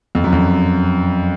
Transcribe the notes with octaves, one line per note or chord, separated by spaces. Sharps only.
F2
F#2
F2